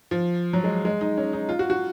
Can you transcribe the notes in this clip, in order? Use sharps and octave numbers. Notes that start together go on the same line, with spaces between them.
F3
F#3
G#3
G#3
D#4
C#4
D#4
F4
F#4
F#4